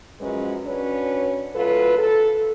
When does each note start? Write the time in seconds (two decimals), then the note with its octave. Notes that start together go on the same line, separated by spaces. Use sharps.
0.20 F#2 F3 F#3 G#3 C#4 B4
0.65 C#4 D4 F#4 B4 C#5
1.54 D2 F#3 F4 A4 B4
1.97 A4